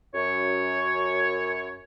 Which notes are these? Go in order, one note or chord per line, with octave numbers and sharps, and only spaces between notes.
F#2 C#5